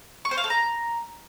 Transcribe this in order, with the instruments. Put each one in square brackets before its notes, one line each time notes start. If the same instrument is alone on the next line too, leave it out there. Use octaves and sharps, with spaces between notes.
[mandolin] C#6
C5
F5
A4
A#5